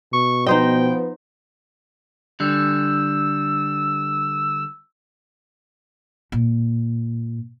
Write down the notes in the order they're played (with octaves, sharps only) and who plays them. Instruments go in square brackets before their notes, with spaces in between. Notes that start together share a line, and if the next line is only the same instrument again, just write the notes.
[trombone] B2 [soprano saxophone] C#6
[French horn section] F3 B3 [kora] D#4 C5 D#5 [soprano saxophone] G5
[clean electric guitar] D3 G3 [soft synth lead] E6
[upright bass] A#2